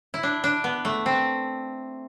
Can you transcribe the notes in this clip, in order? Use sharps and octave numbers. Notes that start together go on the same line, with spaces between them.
E4
D4
D4
B3
A3
C4